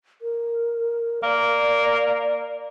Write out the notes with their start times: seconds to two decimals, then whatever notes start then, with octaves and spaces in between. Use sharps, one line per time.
0.22 A#4
1.23 A#3 D5